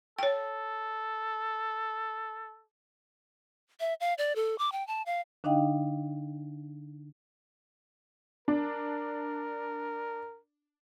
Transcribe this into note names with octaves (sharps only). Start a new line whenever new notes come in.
A4 C#5 G5
E5
F5
D5
A4
D6
G5
A5
F5
D3 D4 D#4 D#5 F5 G5
D4 A#4